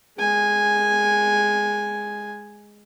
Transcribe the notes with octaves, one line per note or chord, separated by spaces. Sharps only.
G#3 G#5